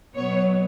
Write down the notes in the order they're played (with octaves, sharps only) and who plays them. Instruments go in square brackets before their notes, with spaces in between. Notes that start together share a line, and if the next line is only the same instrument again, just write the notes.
[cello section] B2 F#3 B3 C#5